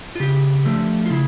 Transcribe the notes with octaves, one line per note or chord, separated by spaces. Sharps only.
F4
C#3 G4
F3 A3 D4
F4
C#3 E4